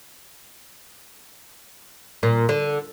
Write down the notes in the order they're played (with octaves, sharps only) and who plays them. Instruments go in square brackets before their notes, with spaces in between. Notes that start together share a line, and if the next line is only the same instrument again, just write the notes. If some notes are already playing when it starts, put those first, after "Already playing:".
[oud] A#2
D3